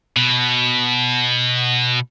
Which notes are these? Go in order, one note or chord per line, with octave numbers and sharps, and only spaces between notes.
B2